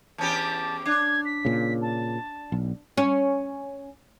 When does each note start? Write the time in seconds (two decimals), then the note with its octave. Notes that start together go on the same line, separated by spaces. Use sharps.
0.18 E2 C#4 G4 A5
0.86 D4 G#6
1.25 B6
1.45 A#2 C#3
1.81 A5
2.52 B1
2.97 C#4